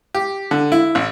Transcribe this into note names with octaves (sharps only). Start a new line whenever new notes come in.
G4
D3
E4
A1